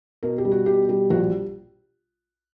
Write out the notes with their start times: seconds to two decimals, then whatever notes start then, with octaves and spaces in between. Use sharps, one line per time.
0.23 B2 A#4
0.38 G4
0.45 G3
0.51 F#4
0.66 B2 G4
0.89 G3 G4
1.10 A#1 F#4